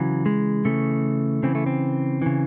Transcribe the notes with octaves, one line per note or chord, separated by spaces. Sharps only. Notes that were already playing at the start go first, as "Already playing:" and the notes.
Already playing: C#3 E3 F#3
G#3
C#3 E3 A3
C#3 E3 C4
A3
C4
C#3 E3